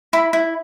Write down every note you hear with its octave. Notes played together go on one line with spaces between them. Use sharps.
E4 B5
E4